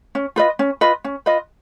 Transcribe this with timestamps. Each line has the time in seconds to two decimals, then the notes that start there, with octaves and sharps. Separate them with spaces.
0.15 C#4
0.36 F4 B4 D#5
0.59 C#4
0.81 F4 B4 D#5
1.04 C#4
1.26 F4 B4 D#5